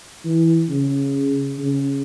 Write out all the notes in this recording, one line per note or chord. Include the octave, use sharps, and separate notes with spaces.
E3
C#3
C#3